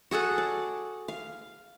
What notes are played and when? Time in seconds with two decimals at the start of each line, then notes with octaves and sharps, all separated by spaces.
0.11 F#4 G#4 A4 F#5
0.38 D5
1.08 F5